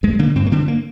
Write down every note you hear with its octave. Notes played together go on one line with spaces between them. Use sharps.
G2 G#3
D3 A#3
G2 C4
A#3
D3 C4
A#3